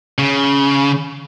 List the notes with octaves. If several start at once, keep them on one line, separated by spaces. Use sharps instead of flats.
C#3